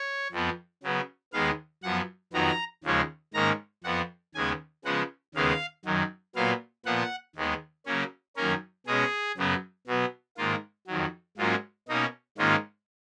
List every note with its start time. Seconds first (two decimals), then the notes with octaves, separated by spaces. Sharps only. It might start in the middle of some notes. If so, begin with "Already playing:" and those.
Already playing: C#5
0.32 F2 F3 B3
0.83 C#3 F#3 B3
1.33 D#2 D#3 G#3 B3 F5
1.83 F#2 F3 B3 F#5
2.33 F2 D#3 F#3 B3 A#5
2.84 D#2 C#3 F3 G#3 C#4
3.34 G#2 D#3 A#3 C#4 A#5
3.84 F2 F3 B3 F#5
4.35 D#2 C#3 G#3 B3 G#5
4.85 C#3 F3 G#3 B3 F#5
5.35 D#2 C#3 G#3 B3 F5
5.85 F#2 D#3 F#3
6.36 A#2 F#3 B3 F5
6.86 A#2 F3 B3 F#5
7.36 D#2 D#3 G#3 B3
7.86 C#3 F#3 A#3 C#4
8.36 F#2 D#3 A#3 C#4 A#4
8.86 B2 G#3 C#4 G#4
9.37 F#2 C#3 F#3 B3
9.87 B2 F#3 B3
10.37 G#2 D#3 A#3 F4
10.87 F2 D#3 F#3
11.37 G#2 F#3 A#3 C#4 F4
11.88 B2 A#3 C#4 D#4
12.38 G#2 D#3 A#3 C#4 F4